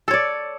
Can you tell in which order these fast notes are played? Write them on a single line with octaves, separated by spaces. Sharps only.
A4 C#5 D5